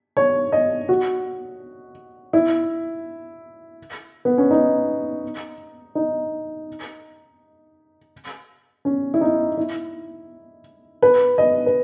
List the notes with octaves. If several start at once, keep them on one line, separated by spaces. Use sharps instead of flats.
C#5
D#5
F#4
E4
B3
C#4
D#4
D#4
C#4
E4
D#4
E4
B4
D#5
B4